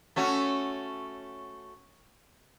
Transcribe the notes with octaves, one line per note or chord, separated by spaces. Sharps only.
A3 C#4 F#4